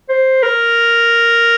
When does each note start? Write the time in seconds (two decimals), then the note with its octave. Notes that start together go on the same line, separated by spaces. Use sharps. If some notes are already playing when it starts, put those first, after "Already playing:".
0.09 C5
0.43 A#4